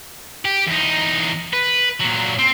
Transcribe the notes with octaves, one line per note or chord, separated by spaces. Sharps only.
G4
E2 D#4
B4
A#2 F#3
C4